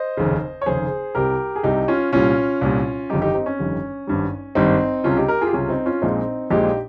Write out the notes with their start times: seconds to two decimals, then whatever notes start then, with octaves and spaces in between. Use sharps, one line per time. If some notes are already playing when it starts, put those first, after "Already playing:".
Already playing: C5 D#5
0.17 F1 D#2 C#3
0.61 C#5
0.66 F1 D#2 C#3 G#4 C5
1.15 C2 C3 G3 G4 A#4
1.56 G#4
1.63 C2 C3 G3 D#4 G4
1.88 C#4 F4
2.12 C2 A#2 G3 C#4 F4
2.61 C2 A#2 G3
3.10 G1 F2 D#3 G3 D#4 G4
3.22 D#4 G4
3.34 C4 D#4
3.46 C#4
3.59 G1 F2 D#3 G3
4.07 G#1 G2 G3
4.55 G#1 G2 G3 C4 D#4
5.04 C#2 C3 G3 C#4 F4
5.17 D#4 G4
5.28 G4 A#4
5.41 F4 G#4
5.47 G4
5.53 C#2 C3 G3 C#4 F4
5.69 C4 D#4
5.86 C#4 F4
6.02 A#1 A#2 G#3 C4 D#4
6.51 A#1 A#2 G#3 D#4 G4